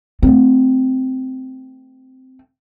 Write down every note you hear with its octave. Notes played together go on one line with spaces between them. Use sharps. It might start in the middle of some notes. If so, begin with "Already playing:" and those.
A3 C4